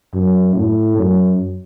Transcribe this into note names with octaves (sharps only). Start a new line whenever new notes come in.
F#2
A2
F#2